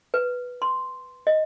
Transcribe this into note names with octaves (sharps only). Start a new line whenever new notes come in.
B4
C6
D#5